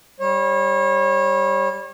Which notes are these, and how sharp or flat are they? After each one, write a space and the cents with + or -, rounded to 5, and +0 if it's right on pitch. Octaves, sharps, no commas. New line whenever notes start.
G3 +0 C#5 -35